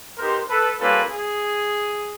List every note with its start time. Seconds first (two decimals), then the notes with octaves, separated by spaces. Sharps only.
0.18 B3 D#4 G4 A#4 C5
0.49 A4 B4
0.80 G3 A#3 C#4 F4 A4 B4
1.10 G#4